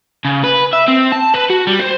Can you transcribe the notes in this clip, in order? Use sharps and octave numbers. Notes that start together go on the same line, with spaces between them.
C#3
B4
E5
C4
A5
B4
F#4
G3
C5